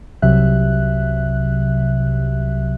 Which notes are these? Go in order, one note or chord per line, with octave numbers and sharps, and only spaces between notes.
C2 C3 F#3 E5 F#6